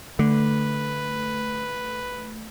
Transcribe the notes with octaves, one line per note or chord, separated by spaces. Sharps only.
D3 A3 B4